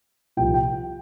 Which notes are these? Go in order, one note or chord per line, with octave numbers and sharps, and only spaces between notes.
C2 A#2 F3 G5
G5